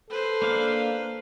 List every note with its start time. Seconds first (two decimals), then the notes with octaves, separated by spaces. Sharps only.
0.10 A4 B4 C5
0.42 A#3 D4 F5